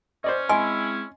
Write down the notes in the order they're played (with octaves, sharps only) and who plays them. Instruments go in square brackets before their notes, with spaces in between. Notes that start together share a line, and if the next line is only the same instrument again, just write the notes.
[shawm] C#4 [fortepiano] C5 D5 D#5
[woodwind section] G#3 C4 E4 [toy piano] D#5 G#5 [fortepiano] C6